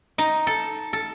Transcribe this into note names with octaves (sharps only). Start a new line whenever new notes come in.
D#4
A4
A4